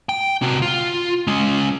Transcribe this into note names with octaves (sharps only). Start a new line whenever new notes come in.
G5
C3 F#4
F4
G#3 C#4